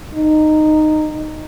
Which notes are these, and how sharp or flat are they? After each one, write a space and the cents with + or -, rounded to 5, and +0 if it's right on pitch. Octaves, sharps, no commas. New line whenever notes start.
D#4 -15